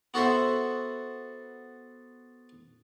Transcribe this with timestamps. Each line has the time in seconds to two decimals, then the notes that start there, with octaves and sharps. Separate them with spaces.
0.14 B3 F#4 A4 C5 E5